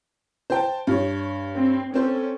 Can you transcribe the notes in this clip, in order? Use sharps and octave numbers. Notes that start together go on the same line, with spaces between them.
C5 G5 A5
G2 C#5
C4
C4 C#4 A4 C5